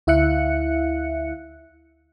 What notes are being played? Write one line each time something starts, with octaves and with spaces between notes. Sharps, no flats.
D2 E4 E5 F5 F#6 C#7